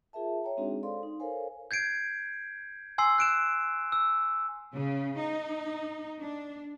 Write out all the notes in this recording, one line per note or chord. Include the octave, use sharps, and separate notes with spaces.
F4 G#4 A#4 E5 A5
C#5 E5 G5 A#5
G#3 C4 D4 D#4 F#4 G#4
A4 C5 D5 F5 G5 C6
D#4
A4 A#4 C5 C#5 F5 G#5
G6 G#6 C7 D7
G#5 C6 E6 C7
F#6 D7 E7
E6
C#3
D#4
D4